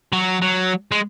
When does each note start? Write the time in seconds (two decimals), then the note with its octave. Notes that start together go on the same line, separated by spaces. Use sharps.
0.13 F#3
0.41 F#3
0.92 G#3